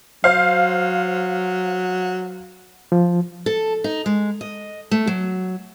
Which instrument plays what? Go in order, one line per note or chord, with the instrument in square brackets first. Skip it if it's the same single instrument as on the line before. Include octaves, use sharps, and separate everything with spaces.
[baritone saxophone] F#3 [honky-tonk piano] C5 F5
[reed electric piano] F3
[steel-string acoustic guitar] A4
D#4
G#3
D#5
A3
F#3